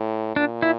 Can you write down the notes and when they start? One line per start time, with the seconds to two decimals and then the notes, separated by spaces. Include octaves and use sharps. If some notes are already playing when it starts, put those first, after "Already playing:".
Already playing: A2
0.36 A#2 D4
0.62 E4